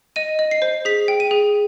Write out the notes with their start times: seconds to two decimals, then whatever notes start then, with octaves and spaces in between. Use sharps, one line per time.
0.16 D#5 D#7
0.39 D#5
0.51 C7
0.62 C5
0.85 G#4 B6
1.08 G5
1.20 D#7
1.31 G#4